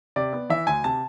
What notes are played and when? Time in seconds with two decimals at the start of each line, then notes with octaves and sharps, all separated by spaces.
0.16 C3 D5
0.33 B3
0.50 E3 E5
0.67 D2 G#5
0.84 C3 A5